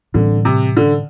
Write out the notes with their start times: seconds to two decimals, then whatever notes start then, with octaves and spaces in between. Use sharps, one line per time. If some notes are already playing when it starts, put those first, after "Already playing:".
0.14 A2 D3 E3 G3 C4
0.45 C3
0.77 D3